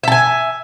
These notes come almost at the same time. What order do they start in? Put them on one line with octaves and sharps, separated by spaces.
E5 A5 G#5